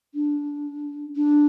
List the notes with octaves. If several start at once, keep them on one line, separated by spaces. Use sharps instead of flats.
D4
D4